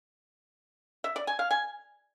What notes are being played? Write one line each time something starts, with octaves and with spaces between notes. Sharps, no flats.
E5
D5
G#5
F5
G#5